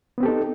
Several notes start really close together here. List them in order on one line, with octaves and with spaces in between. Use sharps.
B3 C4 G4 A4 D#4